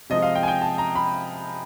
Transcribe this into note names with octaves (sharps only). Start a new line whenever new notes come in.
C3 F3 G#3 D#5
F5
G5
G#5
G5
A5
A#5
B5